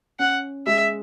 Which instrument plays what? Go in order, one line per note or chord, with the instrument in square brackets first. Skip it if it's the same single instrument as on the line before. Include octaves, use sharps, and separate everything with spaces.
[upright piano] C#4 [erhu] F#5
[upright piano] G#3 [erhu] E5